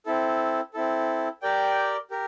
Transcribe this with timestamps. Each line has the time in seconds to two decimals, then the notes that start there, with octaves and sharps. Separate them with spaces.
0.06 C4 E4 A4
0.74 C4 E4 A4
1.42 G4 A#4 D5 G5
2.11 G4 A#4